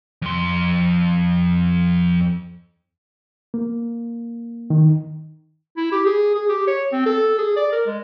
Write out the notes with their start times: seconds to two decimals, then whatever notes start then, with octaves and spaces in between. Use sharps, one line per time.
0.22 F2 C6
3.54 A#3
4.70 D#3
5.77 E4
5.92 G4
6.06 G#4
6.35 G#4
6.49 G4
6.67 C#5
6.92 C4
7.06 A4
7.38 G#4
7.56 D5
7.72 A#4
7.87 G#3